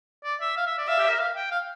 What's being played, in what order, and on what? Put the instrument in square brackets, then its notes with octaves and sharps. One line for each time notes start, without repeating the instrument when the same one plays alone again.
[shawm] D5
E5
F5
E5
D5
[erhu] E5 [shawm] F5
[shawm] G4
A#4
F5
G5
F5